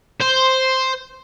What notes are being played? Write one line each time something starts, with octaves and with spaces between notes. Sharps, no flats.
C5